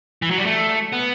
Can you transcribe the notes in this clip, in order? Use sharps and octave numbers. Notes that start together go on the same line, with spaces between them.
E3
F#3
G3
A3
B3